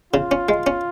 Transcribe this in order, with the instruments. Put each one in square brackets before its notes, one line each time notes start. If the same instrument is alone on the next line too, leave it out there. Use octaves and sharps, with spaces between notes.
[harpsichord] C#3 [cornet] F4
[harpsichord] C#4
G#3
C#4